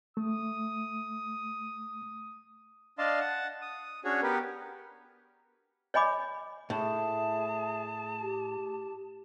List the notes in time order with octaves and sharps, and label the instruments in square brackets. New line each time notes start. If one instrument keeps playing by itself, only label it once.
[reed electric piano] A3 [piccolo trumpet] D#6
[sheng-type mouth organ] D4 D5 D#5 F5 A5 C6
F#5 A5
D#6
C#4 D4 F#4 G#4 C#5
B3 G4 A#4 B4
[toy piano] C#5 D#5 G#5 B5 D6
[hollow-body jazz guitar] A2 [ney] G#4 [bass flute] E5 [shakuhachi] A5
[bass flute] G4